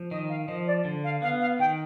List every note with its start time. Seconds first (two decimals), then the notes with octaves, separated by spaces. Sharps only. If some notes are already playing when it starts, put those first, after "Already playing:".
Already playing: F3
0.11 D#3 D#5
0.29 F5
0.48 F3 D#5
0.67 D5
0.85 D3
1.04 F5
1.22 B3 F5
1.40 F5
1.59 D#3 G5